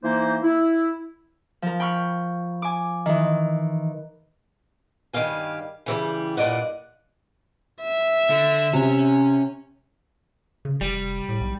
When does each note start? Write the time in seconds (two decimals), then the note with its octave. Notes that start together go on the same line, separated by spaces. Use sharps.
0.03 E3 A#3 D#4 C5
0.43 E4
1.62 F3 A#4
1.80 G5 B5 C#6 F6
2.62 G#5 D6
3.06 D#3 E3
5.13 G2 D#3 G3 F5 G#5
5.86 C#3 E3 G3
6.37 G2 A#2 A3 D5 D#5 F#5
7.82 E5
8.30 D3
8.73 C3 C#4
10.65 C#3
10.81 F1 G3
11.29 A2
11.41 B1